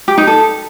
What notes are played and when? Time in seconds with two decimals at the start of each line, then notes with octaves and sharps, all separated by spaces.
0.08 G4
0.18 D#4
0.27 A4